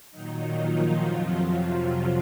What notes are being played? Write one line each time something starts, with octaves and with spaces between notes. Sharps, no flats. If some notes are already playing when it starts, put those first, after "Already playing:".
A#2 D#3 F#3 D#4
F3 F4
F2 C3 F#3